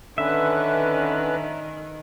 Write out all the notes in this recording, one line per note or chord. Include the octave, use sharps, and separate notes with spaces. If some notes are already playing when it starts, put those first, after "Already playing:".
D3 D#3 C#4 B4 E5